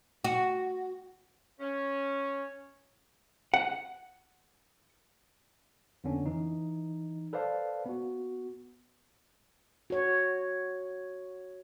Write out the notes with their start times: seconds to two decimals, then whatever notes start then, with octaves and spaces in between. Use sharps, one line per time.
0.24 F#4
1.60 C#4
3.54 F#5
6.04 F2 D3 B3 C#4 D4
6.26 E3 D#4
7.33 A4 B4 C5 D5 F5 A5
7.86 B3 F#4
9.90 F#4 C#5